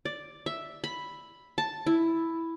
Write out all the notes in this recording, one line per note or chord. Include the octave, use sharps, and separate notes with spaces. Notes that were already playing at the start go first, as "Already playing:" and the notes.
D5
E5
B5
A5
E4